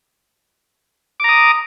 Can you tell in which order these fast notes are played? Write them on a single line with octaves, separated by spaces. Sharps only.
D6 A#5 D#6